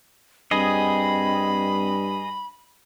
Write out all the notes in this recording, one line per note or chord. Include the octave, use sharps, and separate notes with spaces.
G2 C4 G#4 D#5 B5